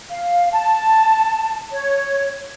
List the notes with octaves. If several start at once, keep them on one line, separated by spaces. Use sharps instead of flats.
F5
A5
C#5